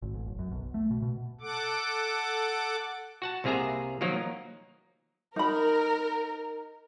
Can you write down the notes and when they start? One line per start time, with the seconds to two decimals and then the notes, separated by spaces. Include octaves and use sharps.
0.02 G#1
0.14 A1
0.26 F#1
0.39 F#2
0.51 B1
0.74 A3
0.91 B2
1.02 B2
1.41 A4 F#5 D6
3.22 F#4 F#5 A5
3.44 C2 C3 A#3 G#4 E5 A#5
4.01 D#3 F3 F#3 A#3 A#4
5.36 D#4 A#4 B5